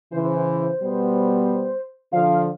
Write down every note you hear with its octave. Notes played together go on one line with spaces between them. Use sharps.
C#3 E3 C5
B2 G3 B3
D3 F3 F5